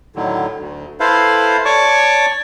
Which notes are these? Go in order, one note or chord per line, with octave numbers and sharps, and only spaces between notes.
A2 D3 D#3 F#3
D2
E4 A4 B4 C5 F5
C#5 D5 A5 C#6 D6